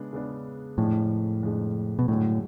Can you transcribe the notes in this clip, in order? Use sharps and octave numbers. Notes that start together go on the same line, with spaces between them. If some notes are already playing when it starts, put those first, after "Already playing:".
Already playing: C#3 G#3 B3 D4
C#3 G#3 B3 D4
F2 A2 C#3 G#3 D4
F2 C#3 G#3 D4
B2
F#2 A2 D3 G#3